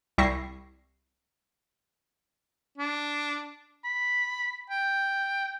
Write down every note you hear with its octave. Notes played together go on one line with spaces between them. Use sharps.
C2 G3 E4 C#6 A#6 C7
D4
B5
G5